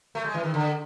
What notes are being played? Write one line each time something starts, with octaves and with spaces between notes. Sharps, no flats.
A3
G#3
E3
D#3
D3